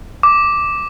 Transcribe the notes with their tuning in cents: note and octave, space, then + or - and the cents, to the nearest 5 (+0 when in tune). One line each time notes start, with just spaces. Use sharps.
D6 +0